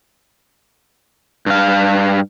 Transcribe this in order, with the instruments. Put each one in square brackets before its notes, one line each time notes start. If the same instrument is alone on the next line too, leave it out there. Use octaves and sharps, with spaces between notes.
[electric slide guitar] G2 F5